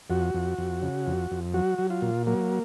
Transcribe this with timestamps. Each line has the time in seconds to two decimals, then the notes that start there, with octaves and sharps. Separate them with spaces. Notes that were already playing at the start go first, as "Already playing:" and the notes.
0.10 F2 F#4
0.34 F2
0.58 F2
0.82 C#3
1.07 F2
1.31 F2
1.54 F#3 F#4
1.78 F#3
1.90 F4
2.02 A#2
2.27 F#3 A#3